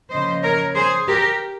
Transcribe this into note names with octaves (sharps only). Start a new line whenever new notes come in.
C#3 F3 A#3 C5 D#5
A#4 C#5
G#4 C5
G4 A#4